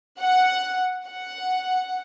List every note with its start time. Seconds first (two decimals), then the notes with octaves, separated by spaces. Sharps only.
0.20 F#5
1.07 F#5